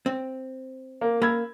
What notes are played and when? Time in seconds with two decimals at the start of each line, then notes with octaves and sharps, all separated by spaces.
0.06 C4
1.01 A#3
1.22 A#3 B5 E6 G#6